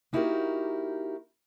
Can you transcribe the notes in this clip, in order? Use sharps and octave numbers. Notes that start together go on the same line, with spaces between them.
A#3 D#4 E4 F#4 G4 A#4